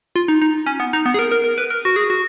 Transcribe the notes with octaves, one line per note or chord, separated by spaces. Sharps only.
F4
D#4
D#4
C#4
B3
D#4
B3
G#4
A#4
A#4
A#4
B4
A#4
F#4
G#4
F#4